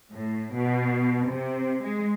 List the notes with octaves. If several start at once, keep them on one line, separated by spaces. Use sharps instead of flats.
A2
B2
C3
G#3